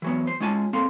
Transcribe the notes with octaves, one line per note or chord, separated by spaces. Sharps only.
E3 F#3 B3
C5
G#3 C#4 F4 G#5 A5
A#3 C4 A4 F5 C6